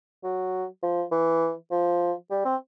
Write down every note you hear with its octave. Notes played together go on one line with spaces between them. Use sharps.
F#3
F3
E3
F3
G3
C4